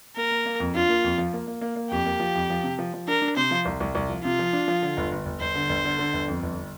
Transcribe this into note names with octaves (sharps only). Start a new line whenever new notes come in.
A#3 A#4
A#3
A#3
F2
D4 F4
A#3
F2
F3
A#3
A#3
A#3
A#3
F2 G4
A#3
F3
F2
F3
C3
F3
F3
D4 A#4
D4
C3 C5
F3
C2
C2
C2
F3
C3 F4
F3
D4
F3
D3
G1
G1
G1
G1 C5
D3
G1
D3
D3
G1
F2
G1